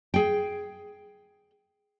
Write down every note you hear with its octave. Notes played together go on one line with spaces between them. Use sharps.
G#4 G5